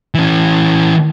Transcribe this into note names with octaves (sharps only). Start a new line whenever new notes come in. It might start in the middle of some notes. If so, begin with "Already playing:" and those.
E3 C#4